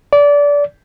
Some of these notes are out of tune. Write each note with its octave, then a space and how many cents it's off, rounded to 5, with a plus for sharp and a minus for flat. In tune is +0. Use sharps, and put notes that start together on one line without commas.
D5 -25